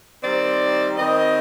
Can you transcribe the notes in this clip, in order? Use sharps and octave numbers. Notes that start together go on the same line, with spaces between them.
D#3 G3 C4 D5
D#3 G3 C4 D#5